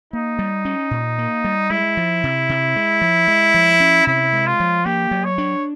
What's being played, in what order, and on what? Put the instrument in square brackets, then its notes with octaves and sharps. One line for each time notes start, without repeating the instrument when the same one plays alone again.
[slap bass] A#3 [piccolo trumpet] D#4
[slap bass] G3
C#4
A#2
A#3
G3
[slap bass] G#3 [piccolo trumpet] E4
[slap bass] F3
C3
C3
G#3
F3
G#3
F3
C#4
[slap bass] C3 [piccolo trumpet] E4
[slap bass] G#3
[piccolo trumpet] F4
[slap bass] F3
[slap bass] A#3 [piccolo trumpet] G4
[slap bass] F#3
[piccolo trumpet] C#5
[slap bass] D4